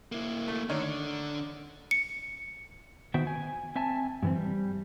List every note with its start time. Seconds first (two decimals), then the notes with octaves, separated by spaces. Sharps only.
0.12 A#3 E4
0.48 A3
0.69 D3 D#3 D4 C#5 D5
1.91 C#7
3.14 D#3 B3 F#4 C5 E5 G5
3.27 G#5
3.76 C4 E5 G#5 A5
4.23 G2 E3 C4
4.35 G3